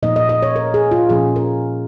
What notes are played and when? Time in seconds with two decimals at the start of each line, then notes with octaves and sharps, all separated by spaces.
0.03 A#2 F3 A#3 D#4 D#5
0.16 D#5
0.29 D#5
0.42 C#5
0.56 A#4
0.74 G#4
0.91 F4
1.09 A#2 F3 A#3 C#4 F4 G#4
1.36 A#4